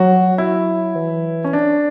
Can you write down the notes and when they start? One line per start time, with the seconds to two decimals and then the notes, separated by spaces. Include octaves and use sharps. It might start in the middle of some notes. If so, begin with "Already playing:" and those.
Already playing: F#3 F#4
0.38 E4
0.95 E3
1.44 C#4
1.53 D4